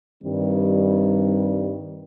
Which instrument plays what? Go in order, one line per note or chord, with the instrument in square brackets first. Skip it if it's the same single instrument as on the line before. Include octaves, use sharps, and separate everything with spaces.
[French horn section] G2 D#3 G3 C4